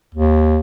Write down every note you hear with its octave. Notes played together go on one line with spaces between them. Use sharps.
D#2